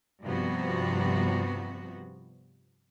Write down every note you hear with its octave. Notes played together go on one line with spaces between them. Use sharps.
G2 C3 F3 B3 F#4